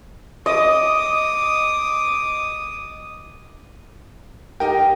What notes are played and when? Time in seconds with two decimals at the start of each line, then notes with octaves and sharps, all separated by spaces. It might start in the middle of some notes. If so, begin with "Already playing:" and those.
0.46 D#5 D6 D#6
4.60 D#4 G4 A#4 G5